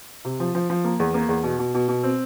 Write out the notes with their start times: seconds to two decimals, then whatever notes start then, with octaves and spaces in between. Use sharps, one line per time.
0.25 C3
0.40 F3
0.55 F3
0.70 F3
0.85 A#3
1.00 E2
1.14 A#3
1.29 E2
1.43 B2
1.59 B2
1.74 B2
1.88 B2
2.03 C4